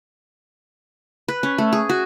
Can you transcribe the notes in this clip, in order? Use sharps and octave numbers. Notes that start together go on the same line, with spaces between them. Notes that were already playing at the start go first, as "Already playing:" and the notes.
B4
C#4
A3
G#4
F#4